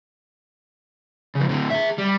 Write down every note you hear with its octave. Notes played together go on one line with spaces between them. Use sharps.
C#3 F3
A2 D3
G#4 E5
G3